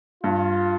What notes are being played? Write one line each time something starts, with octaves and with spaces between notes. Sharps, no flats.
G2 F4